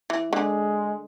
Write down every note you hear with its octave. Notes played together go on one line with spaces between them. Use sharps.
E3
D3 G#3